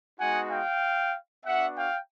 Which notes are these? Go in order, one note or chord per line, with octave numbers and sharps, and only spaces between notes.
G#3 B3 D#4 F#4 F#5 G#5
F5 G5
B3 D4 F#4 E5 F#5
F5 G5